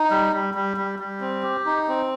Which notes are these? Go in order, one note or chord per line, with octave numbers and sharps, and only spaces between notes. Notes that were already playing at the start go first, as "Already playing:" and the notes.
Already playing: D#4
G3
G3
G3
G3
G3
C4
G4
D#4
C4